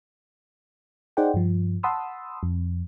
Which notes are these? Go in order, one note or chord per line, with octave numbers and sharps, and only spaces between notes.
D#4 G#4 C5 D5 F#5 G5
G2 F3
F#5 A5 B5 C6 D#6 E6
F2